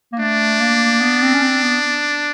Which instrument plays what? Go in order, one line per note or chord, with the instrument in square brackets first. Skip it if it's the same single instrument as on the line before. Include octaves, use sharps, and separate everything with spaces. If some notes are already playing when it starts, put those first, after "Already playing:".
[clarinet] A#3
[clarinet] A3 [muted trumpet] D4
[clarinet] A#3
B3
C4
C#4
C4
B3